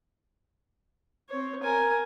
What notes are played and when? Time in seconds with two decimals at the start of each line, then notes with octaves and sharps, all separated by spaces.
1.29 C4 C#5
1.62 A#4 G#5